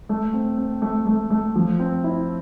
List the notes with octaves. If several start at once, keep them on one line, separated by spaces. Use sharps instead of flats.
A3
C4
C4
A3
A3
A3
F3
C4
E4